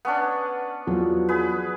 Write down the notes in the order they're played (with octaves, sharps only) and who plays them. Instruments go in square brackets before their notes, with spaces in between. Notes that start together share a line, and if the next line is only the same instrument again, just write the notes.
[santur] B3 C#4 D4
[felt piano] E2 F3 F#3
[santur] G#4 B4